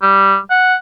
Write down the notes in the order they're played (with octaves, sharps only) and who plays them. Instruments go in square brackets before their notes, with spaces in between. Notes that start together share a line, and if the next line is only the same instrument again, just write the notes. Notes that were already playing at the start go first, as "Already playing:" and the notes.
[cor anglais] G3
F#5